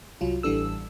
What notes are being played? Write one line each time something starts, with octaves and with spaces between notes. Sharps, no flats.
C2 F#3 F4
A1 E3 G3 D4 A4 E6